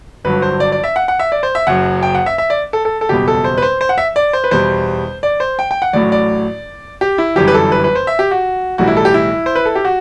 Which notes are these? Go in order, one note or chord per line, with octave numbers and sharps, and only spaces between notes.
G1 G2 F#3 B4
C5
D5
D5
E5
F#5
F#5
E5
D5
C5
E5
F#1 F#2 F#3 F#5
G5
F#5
E5
E5
D5
A4
A4
A4
F#1 E2 B2 G3 G4
A4
C5
B4
C5
C5
F#5
E5
D5
C5
B4
E2 B2 G3 C5
D5
C5
G5
G5
F#5
A1 A2 F#3 D5
D5
G4
E4
G1 F#2 E3 G3 G4
B4
A4
B4
B4
C5
E5
G4
F#4
B1 A2 E3 G3 F#4
E4
A4
G4
E4
C5
B4
A4
G4
F#4